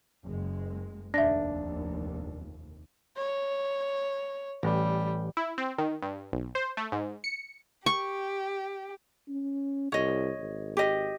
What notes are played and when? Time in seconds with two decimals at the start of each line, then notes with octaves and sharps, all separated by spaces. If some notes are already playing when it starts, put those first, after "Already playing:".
0.23 F#1 G#3
1.14 F1 A#1 D#2 D4 E5 A#6
3.17 C#5
4.63 A1 G3
5.37 E4
5.58 C4
5.78 D#3
6.02 G2
6.32 B1
6.55 C5
6.77 A3
6.92 G#2
7.24 C#7
7.86 G4 C#6
9.28 C#4
9.92 C2 C#5 D#5
10.40 G#1
10.77 G4 D#5